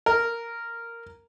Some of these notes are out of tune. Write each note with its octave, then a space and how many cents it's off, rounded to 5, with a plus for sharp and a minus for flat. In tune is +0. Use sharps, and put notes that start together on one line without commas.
A#4 -5